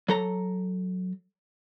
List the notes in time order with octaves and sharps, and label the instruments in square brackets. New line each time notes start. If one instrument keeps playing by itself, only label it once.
[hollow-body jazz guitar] F#3 A4 A#5